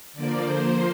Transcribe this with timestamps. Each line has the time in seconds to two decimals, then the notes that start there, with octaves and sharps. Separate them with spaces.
0.13 D3 F3 A#3 D5
0.42 D3 F3 A#3 C5